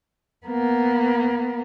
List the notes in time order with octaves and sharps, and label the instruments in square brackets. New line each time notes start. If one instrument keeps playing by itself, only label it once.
[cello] A#3 B3